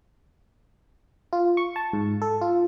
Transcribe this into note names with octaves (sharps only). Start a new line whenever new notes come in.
F4
C#6
A5
G#2
A4
F4